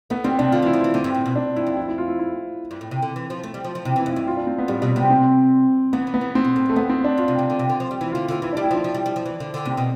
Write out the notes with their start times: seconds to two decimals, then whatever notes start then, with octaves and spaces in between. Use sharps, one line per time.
0.10 A3 B3
0.24 G3 C4
0.39 C3 D4
0.52 D3 F4
0.62 E3
0.66 E4
0.73 F3
0.81 E3 E4
0.94 D3 C4
1.04 G2
1.15 A2
1.26 B2
1.36 D4
1.56 G2 E4
1.67 F2
1.77 E4
1.88 E4
1.98 F4
2.08 E4
2.19 E4
2.71 G2
2.81 A2
2.91 C3
3.02 D3
3.16 E3
3.30 F3
3.43 A3
3.54 G3
3.64 F3
3.75 F3
3.85 C3 E4
3.96 E3
4.00 E4
4.06 F2
4.12 G2 E4
4.27 F4
4.37 D4
4.47 C4
4.59 B3
4.68 A2 G3
4.82 B2 G3
4.96 C3 B3
5.10 C4
5.93 E3 B3
6.07 E3
6.14 B3
6.21 E3
6.35 F3 C4
6.45 B2
6.56 A2
6.66 G2
6.70 A3
6.76 F2 B3
6.90 C4
7.04 D4
7.18 G2 F4
7.28 C3
7.39 C3
7.50 D3
7.59 C3
7.69 D3
7.80 F3
7.91 G3
8.01 E3 E4
8.12 D3 F4
8.28 D3 F4
8.42 E3 E4
8.53 G3 D4
8.64 E4
8.71 F3 D4
8.84 F3
8.94 G3
9.06 G3
9.16 F3
9.26 E3
9.40 D3
9.54 D3
9.65 C3 C4
9.77 B2